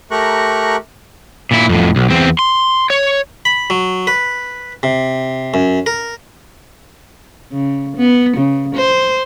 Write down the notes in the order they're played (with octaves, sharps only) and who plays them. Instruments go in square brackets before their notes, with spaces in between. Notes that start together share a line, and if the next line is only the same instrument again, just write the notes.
[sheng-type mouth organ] A3 G4 A#4 A#5 C#6 F#6
[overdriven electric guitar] A#2 E4
F2 A2
B1
E2 C4
C6
C#5
[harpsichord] B5
F#3
B4
C3
F#2
A#4
[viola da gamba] C#3
B3
C#3
C5